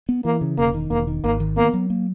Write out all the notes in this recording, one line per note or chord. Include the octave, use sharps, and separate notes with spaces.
B3
E3 A#3
C#3
E1 A#3
D#3
E1 A#3
D#3
G#1 A#3
D#3
A#3 B3
F#3
A#3